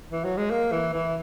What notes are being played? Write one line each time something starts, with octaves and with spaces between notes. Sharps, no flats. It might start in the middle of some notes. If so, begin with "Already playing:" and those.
E3
F#3
G#3
A#3
E3
E3